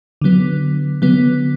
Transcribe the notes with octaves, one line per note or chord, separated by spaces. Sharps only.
D3 F#3 B3
D3 F#3 B3